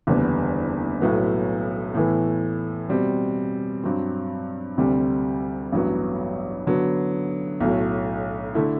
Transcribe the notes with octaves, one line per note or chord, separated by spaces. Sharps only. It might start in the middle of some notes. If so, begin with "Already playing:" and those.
F#1 E2 D3 G3 B3
B1 A2 F#3 B3 F#4
A2 E3 B3
B2 G3 C4
G2 F#3 C4
D2 C3 G3 C4
A1 G2 F#3 B3
D3 F#3 B3
B1 A2 F#3
D3 A3 E4